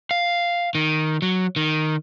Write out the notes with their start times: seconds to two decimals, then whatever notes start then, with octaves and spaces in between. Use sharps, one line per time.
0.11 F5
0.75 D#3
1.22 F#3
1.56 D#3